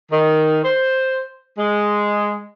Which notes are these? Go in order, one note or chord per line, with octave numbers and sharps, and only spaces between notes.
D#3
C5
G#3